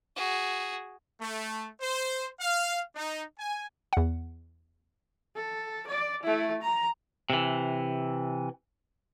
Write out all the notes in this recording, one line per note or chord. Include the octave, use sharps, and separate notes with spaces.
F#4 G#4
A3
C5
F5
D#4
G#5
E2 F#5
A4
D5
A3 E4
A#5
C3 E3